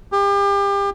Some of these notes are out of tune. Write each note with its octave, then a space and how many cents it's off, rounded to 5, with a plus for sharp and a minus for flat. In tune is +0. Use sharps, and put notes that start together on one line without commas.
G4 +35